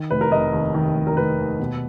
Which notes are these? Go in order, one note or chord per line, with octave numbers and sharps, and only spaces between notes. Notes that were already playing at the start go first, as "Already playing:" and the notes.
Already playing: D#3
F1 B4
A#4
F1 D#5
D#2
D#3
F1
A#4
F1 B4
D#2
B2